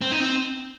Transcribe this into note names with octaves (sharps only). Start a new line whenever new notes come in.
C4
D#4
C4